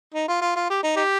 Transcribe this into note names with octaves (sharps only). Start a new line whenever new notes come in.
D#4
F4
F4
F4
G4
D#4
D#4 G4